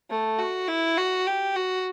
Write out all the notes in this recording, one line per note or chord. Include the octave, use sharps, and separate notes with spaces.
A3
F#4
E4
F#4
G4
F#4